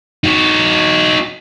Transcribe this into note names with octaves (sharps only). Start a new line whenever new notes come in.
D#4 F#4